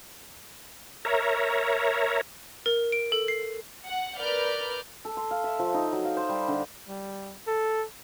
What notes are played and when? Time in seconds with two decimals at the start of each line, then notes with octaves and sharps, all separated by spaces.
1.05 A#4 C#5 E5 A#5
2.66 A#4
2.92 D7
3.12 A4
3.28 C7
3.86 F#5
4.16 A#4 B4 D5 F6 G6
5.05 A4
5.17 C6
5.31 F5
5.44 E5
5.59 F3
5.74 D#4
5.92 F#3
6.04 F5
6.17 C5
6.29 G3
6.48 D3
6.89 G3
7.47 A4